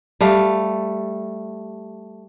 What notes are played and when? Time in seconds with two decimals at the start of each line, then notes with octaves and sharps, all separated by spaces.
0.21 G3 A3 F5